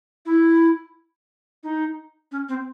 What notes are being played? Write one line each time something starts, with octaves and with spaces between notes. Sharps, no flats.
E4
D#4
C#4
C4